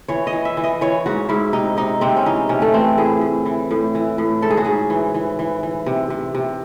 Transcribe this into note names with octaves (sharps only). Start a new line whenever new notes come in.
E3 C#5
D#5
E3
E5
E3
D#5
E3 C#5
G#2 F#4
G#2 E4
C3 D#4
C3 D#4
C3 C4
C#4
E3 D#4
C3 C#4
A3
E3 C4
A2 G#4
A2
E3
A2
E3
A2
G#2 A4
G#4
F#4
G#2 G#4
E3
E3
E3
E3
C3
C3
C3